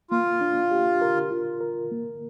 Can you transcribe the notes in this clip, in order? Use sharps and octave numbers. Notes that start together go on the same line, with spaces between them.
A#3 F4
D4
G4
A#4
F4
A#4
A#3